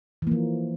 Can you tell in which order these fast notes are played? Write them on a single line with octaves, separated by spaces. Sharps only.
E3 A#3 F3